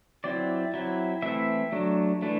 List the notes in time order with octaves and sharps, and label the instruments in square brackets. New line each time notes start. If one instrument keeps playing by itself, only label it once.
[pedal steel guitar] F#3 C4 E4 D5
F#3 C4 E4
E3 A3 C4 E4 E5
F#3 A3 D4
E3 A3 D4